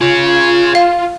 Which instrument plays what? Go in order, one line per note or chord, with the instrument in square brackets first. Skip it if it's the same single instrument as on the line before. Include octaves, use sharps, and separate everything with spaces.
[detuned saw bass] F4 [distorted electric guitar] G#4 C#5
[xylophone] F5